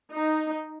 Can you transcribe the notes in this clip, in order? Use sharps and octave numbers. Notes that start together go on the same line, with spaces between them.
D#4